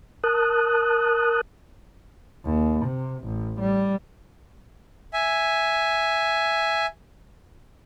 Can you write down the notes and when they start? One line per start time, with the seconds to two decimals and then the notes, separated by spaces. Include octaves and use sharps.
0.24 A#4 A5 D#6 F#6
2.45 D#2
2.84 C3
3.24 A1
3.60 G3
5.13 E5 G#5